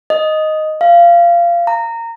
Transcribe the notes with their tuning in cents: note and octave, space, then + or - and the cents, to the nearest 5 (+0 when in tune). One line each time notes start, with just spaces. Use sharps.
D#5 +0
F5 -20
A#5 -20